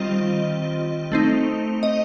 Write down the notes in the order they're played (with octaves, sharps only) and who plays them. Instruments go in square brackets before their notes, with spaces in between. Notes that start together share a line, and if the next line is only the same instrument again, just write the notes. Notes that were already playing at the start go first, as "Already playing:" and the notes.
Already playing: [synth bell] D#3 G3 C4 F4 D#5
A3 C4 D#4
D#5